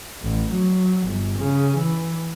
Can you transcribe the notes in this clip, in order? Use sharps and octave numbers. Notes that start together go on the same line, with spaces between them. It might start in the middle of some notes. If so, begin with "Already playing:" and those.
A1
F#3
G1
C#3
E3